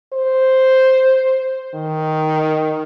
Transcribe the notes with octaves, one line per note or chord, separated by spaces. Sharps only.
C5
D#3